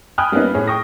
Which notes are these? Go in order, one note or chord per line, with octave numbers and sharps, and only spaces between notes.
G5 G#5 B5 D#6 F6 F#6
G3 A#3 B3 C#4 D#4
A2 G#4 C#5
G5 C#6 D#6 A#6